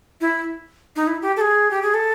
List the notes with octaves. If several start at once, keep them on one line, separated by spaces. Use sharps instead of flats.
E4
D#4
E4
G4
A4
G#4
G4
G#4
A4